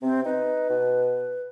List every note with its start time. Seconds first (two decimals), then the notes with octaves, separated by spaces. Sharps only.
0.02 C3 C4
0.25 D#4 B4
0.70 B2